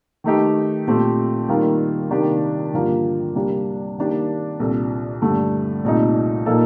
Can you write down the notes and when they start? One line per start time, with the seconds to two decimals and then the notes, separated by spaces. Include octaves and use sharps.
0.24 D#3 A3 D#4 G4
0.87 A#2 A3 C4 G4
1.49 D#3 G3 A#3 F4
2.11 C3 D#3 A#3 D4 G4
2.73 G2 D3 F3 A#3 F4
3.35 C2 C3 G3 A#3 D4
3.98 D#3 A#3 D4 G4
4.60 C2 A#2 G3 D4 A4
5.22 G2 D3 A3
5.84 C2 A#2 A3 D#4
6.46 A#2 F3 A#3 D#4 A4